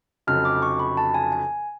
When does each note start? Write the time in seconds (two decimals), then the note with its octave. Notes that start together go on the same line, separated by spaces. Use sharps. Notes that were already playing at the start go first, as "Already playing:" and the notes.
0.27 F1 F2 C#3 F#3 F6
0.45 D6
0.62 C#6
0.79 B5
0.97 A5
1.14 G#5
1.32 G#5